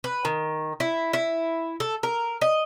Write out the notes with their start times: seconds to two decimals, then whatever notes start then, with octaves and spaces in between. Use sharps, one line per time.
0.04 B4
0.25 D#3
0.80 E4
1.13 E4
1.80 A4
2.03 A#4
2.41 D#5